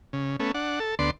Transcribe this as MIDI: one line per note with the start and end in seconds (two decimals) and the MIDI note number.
0.13 0.36 49
0.40 0.52 57
0.40 0.52 59
0.40 0.52 61
0.54 0.79 62
0.54 0.79 78
0.80 0.95 69
0.99 1.11 38
0.99 1.11 59
0.99 1.11 74
0.99 1.11 84